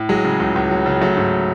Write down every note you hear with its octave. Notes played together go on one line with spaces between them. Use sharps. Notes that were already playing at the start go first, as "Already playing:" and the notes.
Already playing: A2
F#3 G#3
C#3
C#2
C#2
F#3
C#3
F#3 A3
G#2